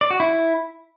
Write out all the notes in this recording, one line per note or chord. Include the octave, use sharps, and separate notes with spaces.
D5
F#4
E4